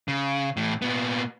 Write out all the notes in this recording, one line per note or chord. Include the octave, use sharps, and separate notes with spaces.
C#3
A2 E3
A#2 B3